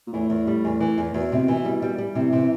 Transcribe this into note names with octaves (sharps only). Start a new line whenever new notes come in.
A#2
E2 A2
E2
G3
E2
E3
E2
E2 B2
C3
E3
G3
G3
G3
C3 E3
C3